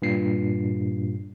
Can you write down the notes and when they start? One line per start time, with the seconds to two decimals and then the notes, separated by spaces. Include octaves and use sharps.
0.02 G2 A#2 C7